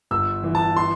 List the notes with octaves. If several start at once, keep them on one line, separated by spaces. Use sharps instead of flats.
G1 E6
E3
A5
C6